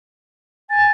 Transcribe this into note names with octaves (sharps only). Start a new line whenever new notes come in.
G#5 A6